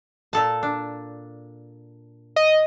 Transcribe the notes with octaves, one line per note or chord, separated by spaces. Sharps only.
A#2 A4 A5
D4
D#5